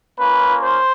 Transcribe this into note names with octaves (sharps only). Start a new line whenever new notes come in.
A#3 C#4 F4 B4
C5